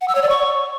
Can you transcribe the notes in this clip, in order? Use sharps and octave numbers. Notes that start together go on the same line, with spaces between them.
F#5
E6
C#5
D5
C#6